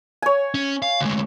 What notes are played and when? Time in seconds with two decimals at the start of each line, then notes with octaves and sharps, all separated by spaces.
0.22 C#5 G#5
0.54 C#4
0.82 F5
1.01 D2 G#3